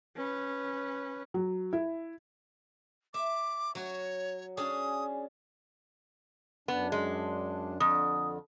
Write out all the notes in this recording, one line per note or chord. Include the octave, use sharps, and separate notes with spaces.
C#4 B4
F#3
E4
E5 D6
F#3 F#4 C#5
C#4 D4 G#4 D#6
F#2 B3 D4
G#3
F2 D3 D#6